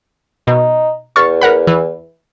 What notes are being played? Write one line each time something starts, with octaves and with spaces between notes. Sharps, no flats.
B2 D#4
E2 C#6 F6 A6
A#4 F#5 B5
E3